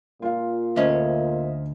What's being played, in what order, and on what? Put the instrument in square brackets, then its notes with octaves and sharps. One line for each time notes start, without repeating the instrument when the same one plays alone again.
[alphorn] A#2 [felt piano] F4 F5
[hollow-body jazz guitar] D2 C#4 [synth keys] C5 D#5 E5